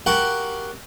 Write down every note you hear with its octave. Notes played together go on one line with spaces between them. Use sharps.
F#4 G4 A#4 F5 F#5